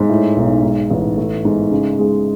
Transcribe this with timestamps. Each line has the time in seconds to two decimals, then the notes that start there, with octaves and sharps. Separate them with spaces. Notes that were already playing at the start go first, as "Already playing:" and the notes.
Already playing: G#2
0.09 A2
0.36 B1
0.63 G#2
0.91 A1
1.17 A3
1.45 G#2
1.71 C#3
1.99 G#3